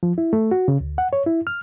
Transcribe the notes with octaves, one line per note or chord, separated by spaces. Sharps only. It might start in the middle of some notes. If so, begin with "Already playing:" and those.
F3
E4
A3
F#4
C#3
D2
F#5
C#5
E4
F6